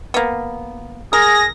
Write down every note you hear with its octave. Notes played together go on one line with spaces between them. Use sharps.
A#3 B3
G#4 A#4 A#6